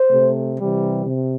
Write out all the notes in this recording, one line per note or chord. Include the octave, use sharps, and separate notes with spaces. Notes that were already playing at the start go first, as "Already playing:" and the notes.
Already playing: C5
C3 A3
C3 E3 G3
C3